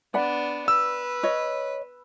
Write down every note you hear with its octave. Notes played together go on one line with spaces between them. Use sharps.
B3 D4 D5 F#5 B5
B4 E6
C#5 D#5